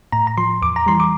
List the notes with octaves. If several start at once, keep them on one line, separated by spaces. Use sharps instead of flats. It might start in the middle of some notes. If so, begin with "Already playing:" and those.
A2 A#5
A#5
F3 C6
E2 D6
A#5
E3 G3 C6
D6